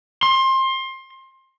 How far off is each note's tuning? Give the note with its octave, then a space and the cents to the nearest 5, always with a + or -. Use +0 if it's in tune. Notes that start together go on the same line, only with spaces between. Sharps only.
C6 +25